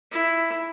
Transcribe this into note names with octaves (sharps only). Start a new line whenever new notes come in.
E4